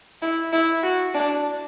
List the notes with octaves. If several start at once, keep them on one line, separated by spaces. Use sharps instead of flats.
E4
E4
F#4
D4